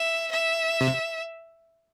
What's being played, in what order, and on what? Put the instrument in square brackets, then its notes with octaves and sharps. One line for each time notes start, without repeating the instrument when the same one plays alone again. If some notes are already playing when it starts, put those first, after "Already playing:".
Already playing: [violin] E5
E5
[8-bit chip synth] C3